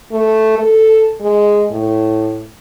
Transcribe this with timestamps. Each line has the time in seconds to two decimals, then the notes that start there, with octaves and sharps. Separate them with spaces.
0.12 A3
0.58 A4
1.20 G#3
1.71 A2